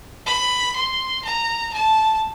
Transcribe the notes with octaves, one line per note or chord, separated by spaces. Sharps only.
B5
C6
A#5
A5